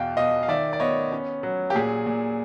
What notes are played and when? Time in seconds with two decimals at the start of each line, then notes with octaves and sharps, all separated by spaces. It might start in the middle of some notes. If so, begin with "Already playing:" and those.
Already playing: E2 B2 F5 G5
0.16 B2 D#5 F5
0.43 F5
0.48 D#3 D5 E5
0.73 D5
0.80 B3 C#5 D#5
1.12 C#4
1.43 F#3
1.70 G4
1.75 A#2 G#4
2.06 A#2